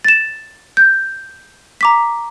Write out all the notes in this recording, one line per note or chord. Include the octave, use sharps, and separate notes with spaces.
A6 E7
G6
A#5 D6 B6